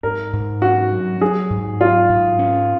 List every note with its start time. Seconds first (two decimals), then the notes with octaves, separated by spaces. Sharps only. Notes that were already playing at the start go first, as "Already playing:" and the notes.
0.03 G#2 A#4
0.33 G#2
0.62 C#4 F#4
0.92 F#3
1.21 F#3 G#4
1.50 G#2
1.81 F#3 F4
2.09 G#2
2.39 C#4